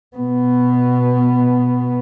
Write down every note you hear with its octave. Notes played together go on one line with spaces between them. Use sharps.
B2 B3